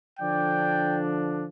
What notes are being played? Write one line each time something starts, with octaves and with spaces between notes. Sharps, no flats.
D3 F3 D4 D5 G5